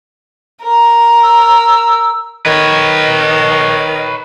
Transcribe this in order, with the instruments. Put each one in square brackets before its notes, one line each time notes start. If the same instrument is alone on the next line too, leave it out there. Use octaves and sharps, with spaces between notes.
[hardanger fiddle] A#4
[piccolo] E6
[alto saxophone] D#3 [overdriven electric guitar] B4 C#5